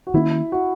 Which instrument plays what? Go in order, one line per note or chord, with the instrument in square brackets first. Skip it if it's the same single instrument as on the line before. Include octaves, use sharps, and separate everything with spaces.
[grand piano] F#4
[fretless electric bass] D#3 A#3 C#4 [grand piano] E4
[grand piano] F#4